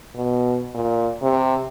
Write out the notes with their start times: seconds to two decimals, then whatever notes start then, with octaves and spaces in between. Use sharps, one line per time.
0.15 B2
0.74 A#2
1.22 C3